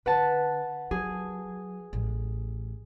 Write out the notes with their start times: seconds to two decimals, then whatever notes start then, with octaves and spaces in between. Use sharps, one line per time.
0.06 D3 B4 F#5 A5
0.91 F#3 G#4
1.93 A1